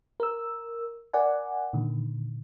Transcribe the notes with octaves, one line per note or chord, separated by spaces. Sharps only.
A#4 E6
A#4 D5 F#5 G#5
A#2 D3 D#3